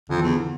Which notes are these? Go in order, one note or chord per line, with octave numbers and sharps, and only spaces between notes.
F2 D3
E3
E2 D3
D3